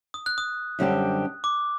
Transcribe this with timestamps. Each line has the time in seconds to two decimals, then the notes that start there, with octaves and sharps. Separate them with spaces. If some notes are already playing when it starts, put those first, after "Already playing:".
0.14 D#6
0.26 F#6
0.38 D#6
0.79 F#2 D3 G3 C4 G4
1.44 D6